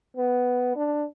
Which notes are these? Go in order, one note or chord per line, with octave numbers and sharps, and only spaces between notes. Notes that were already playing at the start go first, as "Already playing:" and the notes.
B3
D4